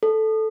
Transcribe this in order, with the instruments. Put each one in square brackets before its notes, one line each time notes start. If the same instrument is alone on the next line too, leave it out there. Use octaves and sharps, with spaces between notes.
[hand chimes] A4